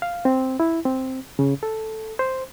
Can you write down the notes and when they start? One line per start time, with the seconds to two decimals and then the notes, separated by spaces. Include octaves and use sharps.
0.02 F5
0.25 C4
0.60 E4
0.85 C4
1.39 C#3
1.63 A4
2.19 C5